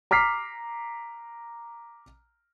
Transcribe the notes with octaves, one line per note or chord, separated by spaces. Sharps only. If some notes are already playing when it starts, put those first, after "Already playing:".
A#5 D6 F6 B6 C7